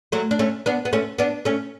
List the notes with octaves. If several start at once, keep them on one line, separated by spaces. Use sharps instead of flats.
F#3 A3
D4
A3 C#4
B3 D4
B3
A3 C#4
B3 D4
A3 C#4